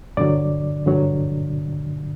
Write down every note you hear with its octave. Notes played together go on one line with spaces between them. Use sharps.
G2 D3 F#3 D5
G2 D3 F#3